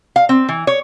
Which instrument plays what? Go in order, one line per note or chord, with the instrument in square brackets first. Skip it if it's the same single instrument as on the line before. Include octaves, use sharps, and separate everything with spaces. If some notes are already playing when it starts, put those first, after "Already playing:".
[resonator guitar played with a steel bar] F5
C4
E3
C#5